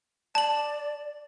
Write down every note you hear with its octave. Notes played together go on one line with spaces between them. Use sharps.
D5 A5 F#7